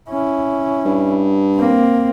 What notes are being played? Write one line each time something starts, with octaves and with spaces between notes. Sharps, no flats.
C#4 E4
G2
A#3 C4